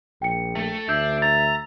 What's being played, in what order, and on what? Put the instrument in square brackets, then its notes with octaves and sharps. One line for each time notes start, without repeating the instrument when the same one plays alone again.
[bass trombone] A#1 [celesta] G5 C#7
[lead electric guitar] A3 A4
[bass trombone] D2 [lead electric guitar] D4 [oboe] E5 [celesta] G6 C7
[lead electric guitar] A#5 [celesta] A6